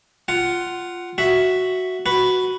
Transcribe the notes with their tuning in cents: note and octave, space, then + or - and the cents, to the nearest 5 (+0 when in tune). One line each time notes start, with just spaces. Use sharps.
F4 +0 F#5 +10
F#4 +0 E5 +0
F#4 +0 B4 +0